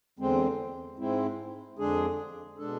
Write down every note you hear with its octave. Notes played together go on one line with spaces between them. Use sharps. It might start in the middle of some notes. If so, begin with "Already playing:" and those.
E2 D3 G#3 C4
G#2 G#3 C4 E4
F2 D3 G#3 D4 G#4
B2 G#3 D4 A4